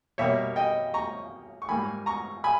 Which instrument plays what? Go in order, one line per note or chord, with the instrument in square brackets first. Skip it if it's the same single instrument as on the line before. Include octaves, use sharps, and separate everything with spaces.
[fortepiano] B2 G3 A#3 C#5 E5
D#5 G5
A#5 C#6
C#6
G#2 G3 A#3 G#5 B5
A#5 C#6
G#5 B5